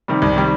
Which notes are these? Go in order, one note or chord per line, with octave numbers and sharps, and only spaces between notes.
C3 D#3 G3
C2
C3 D#3 G3